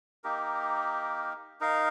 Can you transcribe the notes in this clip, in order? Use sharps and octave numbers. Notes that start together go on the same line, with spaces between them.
A#3 D#4 G4 A#4
D#4 A#4 F5